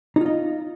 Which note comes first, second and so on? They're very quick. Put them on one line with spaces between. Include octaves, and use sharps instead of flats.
D#4 F4 D#5